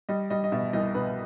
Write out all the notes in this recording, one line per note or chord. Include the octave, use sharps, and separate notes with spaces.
G3 D#5
G3 D#5
D#5
B2 E5
C2 D#5
B2 B4